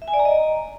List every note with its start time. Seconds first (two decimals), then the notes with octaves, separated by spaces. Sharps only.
0.02 E5
0.08 G#5
0.14 D5
0.19 A#5
0.25 D#5